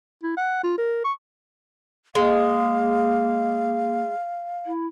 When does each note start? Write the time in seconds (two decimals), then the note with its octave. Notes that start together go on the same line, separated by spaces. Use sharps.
0.23 E4
0.37 F#5
0.64 F4
0.78 A#4
1.04 C#6
2.15 G#3 A#3 F5
4.66 E4